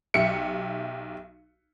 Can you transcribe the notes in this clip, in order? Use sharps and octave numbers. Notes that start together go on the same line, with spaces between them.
B1 G4 E5 C#7